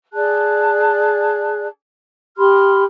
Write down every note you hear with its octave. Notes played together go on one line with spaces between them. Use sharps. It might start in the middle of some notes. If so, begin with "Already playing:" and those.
G#4 D5 A5 F#6
G4 B5 C6 F6